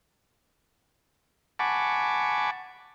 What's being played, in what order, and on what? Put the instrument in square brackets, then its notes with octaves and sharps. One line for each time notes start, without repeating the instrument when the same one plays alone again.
[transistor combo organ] F#5 G#5 A5 B5 C#6 D6